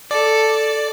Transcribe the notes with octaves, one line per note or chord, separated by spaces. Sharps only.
A4 D5